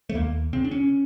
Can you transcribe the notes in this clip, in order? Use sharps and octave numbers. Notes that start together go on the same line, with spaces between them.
A3
D#2 A#3
C#3 C4
D4
C#4